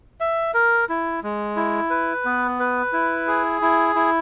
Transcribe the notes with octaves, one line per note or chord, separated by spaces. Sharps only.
E5
A#4
E4
G#3
E4
B4
B3
B4
E4
G#4
E4
E4